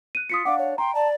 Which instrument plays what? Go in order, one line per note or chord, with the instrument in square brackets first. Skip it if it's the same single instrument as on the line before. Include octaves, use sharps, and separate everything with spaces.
[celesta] F#6 D#7
[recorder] F4 [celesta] D#6 B6 C#7
[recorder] D4 [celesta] F5 F#5 [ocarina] D6
[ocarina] C#5
[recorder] G5 [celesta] A#5 [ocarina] C6
[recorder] D5 [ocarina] A5